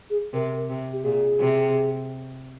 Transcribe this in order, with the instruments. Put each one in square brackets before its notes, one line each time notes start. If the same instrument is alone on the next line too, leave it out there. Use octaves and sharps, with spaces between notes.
[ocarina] G#4
[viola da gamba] C3 [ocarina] A#4
[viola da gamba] C3
[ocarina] G4
[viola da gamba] A#2 [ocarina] G#4
[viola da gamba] C3